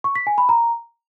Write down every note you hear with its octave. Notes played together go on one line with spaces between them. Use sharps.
C#6
B6
G#5
B5
A#5